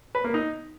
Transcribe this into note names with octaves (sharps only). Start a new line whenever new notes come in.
B4
A#3
D#4